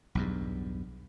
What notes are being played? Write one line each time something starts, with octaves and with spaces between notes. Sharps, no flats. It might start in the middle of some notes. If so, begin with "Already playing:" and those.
B1 E2 G2